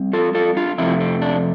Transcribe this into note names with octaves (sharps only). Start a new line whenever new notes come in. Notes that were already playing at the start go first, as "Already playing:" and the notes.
Already playing: G3 C4
F4 A4
F4 A4
D4 F4
F2 C3 F3 A3 C4 E4
C4
D4